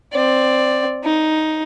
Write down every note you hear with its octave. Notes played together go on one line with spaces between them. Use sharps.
C4 D5
D#4